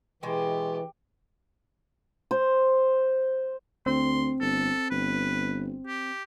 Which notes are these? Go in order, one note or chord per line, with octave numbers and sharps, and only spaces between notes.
B2 E3 G#3 G4 D#5
C5
D2 C4 C6
G1 A4
G1 B4
G4